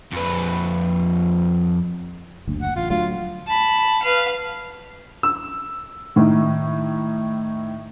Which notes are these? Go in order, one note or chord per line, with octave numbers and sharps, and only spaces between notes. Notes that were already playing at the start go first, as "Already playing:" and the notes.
F2 B4
F#1 D2
F#5
A1 F4
D2 F#3 A3 F4
A5 B5
B4 F5
E6
A2 D#3